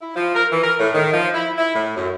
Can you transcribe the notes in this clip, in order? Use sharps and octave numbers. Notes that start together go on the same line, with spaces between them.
E4
F3
A#4
E3
A#4
A2
D#3
F3
E4
E4
A2
F#2